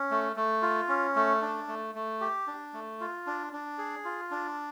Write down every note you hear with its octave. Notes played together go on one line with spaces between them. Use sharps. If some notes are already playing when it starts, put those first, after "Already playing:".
Already playing: C#4
A3
A3
F4
C#4
A3
D4
A3
A3
G4
D4
A3
F4
D4
D4
G#4
F4
D4